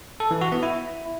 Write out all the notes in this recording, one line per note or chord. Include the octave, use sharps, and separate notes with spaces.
A4
E3
F#4
B3
E4